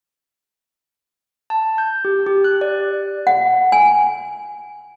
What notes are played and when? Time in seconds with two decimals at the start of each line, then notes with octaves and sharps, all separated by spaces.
1.50 A5
1.78 G6
2.05 G4
2.26 G4
2.44 F#6
2.61 D5
3.27 F#5
3.72 G#5